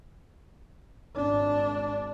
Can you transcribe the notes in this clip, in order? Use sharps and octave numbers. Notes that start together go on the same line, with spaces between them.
G#1 D4